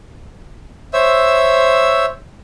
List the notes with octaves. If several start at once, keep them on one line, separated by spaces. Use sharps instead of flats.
C5 C#5 E5 E6